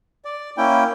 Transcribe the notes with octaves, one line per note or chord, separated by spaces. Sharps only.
D5
A#3 C#4 E4 G5